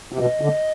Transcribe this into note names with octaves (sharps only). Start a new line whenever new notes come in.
C3
B2 D#5
D3